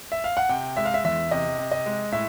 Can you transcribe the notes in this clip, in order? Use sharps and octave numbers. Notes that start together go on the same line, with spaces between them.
E5
F5
F#5
C3 G5
G#3 E5
F5
E5
E2 E5
C3 D#5
C3
D#5
G#3
A2 E5